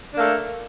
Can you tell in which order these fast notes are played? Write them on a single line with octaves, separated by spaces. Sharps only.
D4 A#3 A3